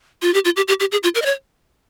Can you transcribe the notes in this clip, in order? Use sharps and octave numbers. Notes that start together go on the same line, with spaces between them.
F4
G4
F4
G4
G4
G4
G#4
F4
A#4
D#5
C#5